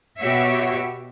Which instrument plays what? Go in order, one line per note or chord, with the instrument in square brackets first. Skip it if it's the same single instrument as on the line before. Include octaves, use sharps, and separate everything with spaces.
[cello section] B2 B3 F#4 G4 C#5 E5